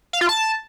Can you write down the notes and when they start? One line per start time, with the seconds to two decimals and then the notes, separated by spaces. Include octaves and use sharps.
0.13 F5
0.21 F4
0.29 A5